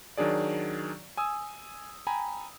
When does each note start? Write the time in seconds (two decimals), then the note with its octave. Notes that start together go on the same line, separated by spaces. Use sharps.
0.17 D#3 F#3 D4 G#4 D5
1.17 G#5 D#6 E6
2.07 G5 G#5 A#5 B5